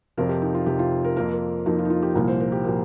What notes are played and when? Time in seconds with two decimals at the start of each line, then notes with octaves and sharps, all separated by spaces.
0.18 F2 C3 F3 A#4
0.29 G4
0.42 D#4
0.55 F4
0.66 F2 C3 F3 G4
0.79 F4
1.04 A#4
1.16 F2 F3 A#3 A#4
1.33 A#4
1.66 F2 F3 A#3 D#4
1.79 F4
1.85 D#4
1.90 F4
2.03 G4
2.15 C2 A#2 F3 A#3 A#4
2.28 C5
2.40 A#4
2.52 G4
2.64 A#2 F3 A#3